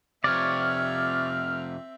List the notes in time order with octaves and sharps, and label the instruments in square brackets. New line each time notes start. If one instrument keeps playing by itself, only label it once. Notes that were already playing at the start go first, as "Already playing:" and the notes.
[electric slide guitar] F2 C3 [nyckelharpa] C4 E5 [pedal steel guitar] C#5 D5 [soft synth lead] F6